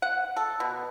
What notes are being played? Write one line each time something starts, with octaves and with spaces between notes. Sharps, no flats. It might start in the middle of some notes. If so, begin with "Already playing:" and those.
F#5
A4
B2